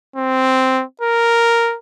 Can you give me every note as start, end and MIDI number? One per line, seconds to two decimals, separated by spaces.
0.16 0.83 60
1.01 1.76 70